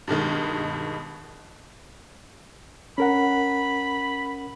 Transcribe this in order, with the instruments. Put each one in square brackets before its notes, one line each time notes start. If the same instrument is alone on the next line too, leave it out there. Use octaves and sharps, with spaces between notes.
[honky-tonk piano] G2 B2 D#3 G#3
[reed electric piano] C#4 A#4 F#5 [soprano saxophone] B5